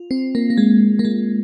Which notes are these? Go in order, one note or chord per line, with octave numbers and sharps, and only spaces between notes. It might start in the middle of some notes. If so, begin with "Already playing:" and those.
Already playing: F4
C4
A#3
A#3
G#3
A#3
G#3